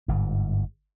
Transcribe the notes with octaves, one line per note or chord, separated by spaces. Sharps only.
G1 G#2